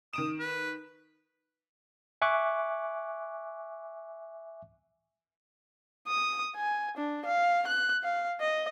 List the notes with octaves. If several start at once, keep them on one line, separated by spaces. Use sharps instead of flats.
D#3 D#6 D7 E7
B4
E5 G#5 C#6 D6 F#6
D#6
G#5
D4
F5
F#6
F5
D#5